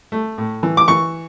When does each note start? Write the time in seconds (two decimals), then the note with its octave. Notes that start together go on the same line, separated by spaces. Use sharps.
0.12 A3
0.38 A2
0.63 E3
0.77 D6
0.88 E3 C#6